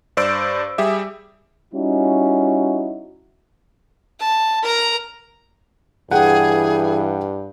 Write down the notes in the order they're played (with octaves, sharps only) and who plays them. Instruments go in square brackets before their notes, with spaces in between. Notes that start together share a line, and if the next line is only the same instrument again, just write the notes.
[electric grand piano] G2 C5 D5 E6 D7
G3 G4 G#4 E5
[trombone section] G3 C#4 D#4 E4 F#4
[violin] A5
A#4 A#5
[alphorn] G2 [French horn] E3 [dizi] G#4 [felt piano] F#5 G5